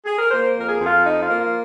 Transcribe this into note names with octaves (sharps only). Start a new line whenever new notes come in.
G#4
A#4
A#3 C5
F2 A#4
G#4
F2
F4
F3 D#4
F4
A#3
F4